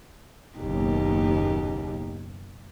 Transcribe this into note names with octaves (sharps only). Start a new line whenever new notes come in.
F#1 D#2 B2 D#4 G4